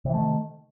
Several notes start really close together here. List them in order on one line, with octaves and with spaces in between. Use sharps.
C3 E3 A3 D#3